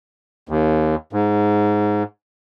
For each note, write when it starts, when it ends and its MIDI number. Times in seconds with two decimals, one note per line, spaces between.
0.49 0.95 39
1.13 2.03 44